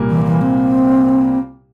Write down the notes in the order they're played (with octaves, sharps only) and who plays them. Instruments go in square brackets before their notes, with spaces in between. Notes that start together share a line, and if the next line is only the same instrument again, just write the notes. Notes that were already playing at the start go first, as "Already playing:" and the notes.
Already playing: [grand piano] C2 A#2 G3 A#3
[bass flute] E3
E3
C4